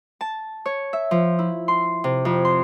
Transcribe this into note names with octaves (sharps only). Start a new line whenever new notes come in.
A5
C#5
E5
F3
E4
C6
C3
F2
C6